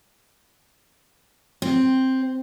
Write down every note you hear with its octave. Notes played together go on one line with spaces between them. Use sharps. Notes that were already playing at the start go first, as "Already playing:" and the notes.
C4